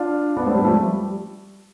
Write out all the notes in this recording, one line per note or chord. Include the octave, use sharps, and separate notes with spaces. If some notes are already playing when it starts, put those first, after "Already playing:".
Already playing: D4 F4
B3 D4
A3 C4
G3 B3
F3 A3
G3